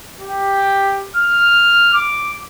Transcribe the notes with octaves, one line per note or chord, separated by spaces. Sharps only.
G4
F6
D6